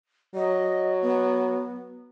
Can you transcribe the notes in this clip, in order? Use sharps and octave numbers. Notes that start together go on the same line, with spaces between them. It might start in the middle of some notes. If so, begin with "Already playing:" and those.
F#3 D#5
B3